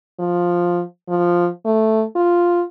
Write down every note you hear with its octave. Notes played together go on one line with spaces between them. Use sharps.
F3
F3
A3
F4